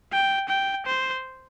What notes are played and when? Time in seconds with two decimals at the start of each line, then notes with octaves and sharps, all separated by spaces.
0.12 G5
0.49 G5
0.86 C5